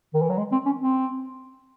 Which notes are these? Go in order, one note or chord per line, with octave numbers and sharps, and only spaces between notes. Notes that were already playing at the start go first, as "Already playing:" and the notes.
D#3
E3
F#3
G#3
C4
C#4
C4